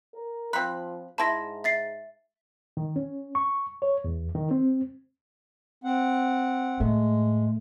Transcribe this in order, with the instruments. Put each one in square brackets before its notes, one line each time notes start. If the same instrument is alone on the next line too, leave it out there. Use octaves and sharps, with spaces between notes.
[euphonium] A#4
[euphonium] F3 [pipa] C4 B5 [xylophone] F#6
[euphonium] G#2 [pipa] E4 B5 [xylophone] A5 C6 A#6
[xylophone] E5 A6 C7
[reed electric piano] D#3
C#4
C#6
C#5
E2
D#3
C4
[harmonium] C4 F#5
[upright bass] A2 [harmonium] G#3 [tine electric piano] A3